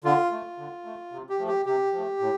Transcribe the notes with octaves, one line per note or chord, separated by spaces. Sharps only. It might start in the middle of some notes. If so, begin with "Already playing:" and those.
D3 F4
A3
D3
A3
C3
G4
F3 A3
G4
C3 G4
F3 A3
A2